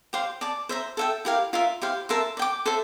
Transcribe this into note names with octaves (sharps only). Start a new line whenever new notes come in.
G4 C5 F5 C6
D5 A5 D6
C5 E5 A#5
A4 E5 G5
E4 G4 A#4 F5
F4 A#4 E5
E4 G4 C5 F5
A#4 E5 A5 C6
D5 G5 D6
A4 C5 E5